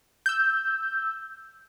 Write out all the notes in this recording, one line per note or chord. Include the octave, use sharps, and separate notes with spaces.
E6 G6